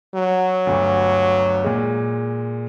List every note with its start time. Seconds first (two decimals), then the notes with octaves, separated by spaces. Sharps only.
0.15 F#3
0.67 G1 D2
1.64 A#2 G#3